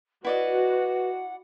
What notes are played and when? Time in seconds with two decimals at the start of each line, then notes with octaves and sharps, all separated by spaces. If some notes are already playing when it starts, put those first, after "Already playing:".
0.25 E4 F#4 B4 D5 D#5 F#5